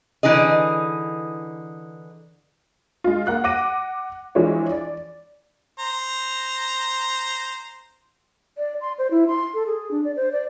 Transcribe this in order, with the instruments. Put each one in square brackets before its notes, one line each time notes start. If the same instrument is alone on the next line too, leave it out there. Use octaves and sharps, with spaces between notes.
[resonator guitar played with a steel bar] D3 E3 D#4 G#4 D#5
[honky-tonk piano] G#3 F4
A#3 F#5 F#6
F#5 D6 A#6 D#7
E3 F3 G#3 D4 F4 C#5
D5
[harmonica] C5 A#5
[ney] D5
C6
C5
E4
C6
A4
G#4
D4
D5
C5
D5